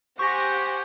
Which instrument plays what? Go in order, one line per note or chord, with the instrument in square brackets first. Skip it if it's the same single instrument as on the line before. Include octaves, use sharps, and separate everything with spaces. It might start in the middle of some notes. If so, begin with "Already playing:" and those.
[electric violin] G4 [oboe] C5 [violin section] F#5 G#5 [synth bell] C#6 A#6